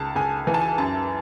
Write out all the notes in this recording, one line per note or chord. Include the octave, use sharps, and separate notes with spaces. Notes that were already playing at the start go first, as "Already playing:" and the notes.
Already playing: C#2 A5
C#2 G#5
E3 G#5
A5
G#5
F#2 A5